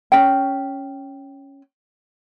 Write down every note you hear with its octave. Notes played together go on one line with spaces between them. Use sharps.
C#4 G5